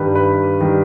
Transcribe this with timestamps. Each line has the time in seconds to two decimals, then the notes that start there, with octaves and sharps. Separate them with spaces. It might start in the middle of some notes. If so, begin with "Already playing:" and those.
Already playing: G2 D#3 G3 B4
0.15 B4
0.61 D#3 G3